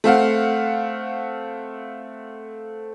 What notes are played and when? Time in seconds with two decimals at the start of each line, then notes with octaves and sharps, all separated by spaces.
0.04 A3 C4 F5 F#5